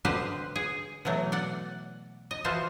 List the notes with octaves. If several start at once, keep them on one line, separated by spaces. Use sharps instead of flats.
D3 G4 B4 C5 D#5
G#4
B2 E3 F#3 A3
D5 F#5
D#5
E3 F3 F#4 C5 A5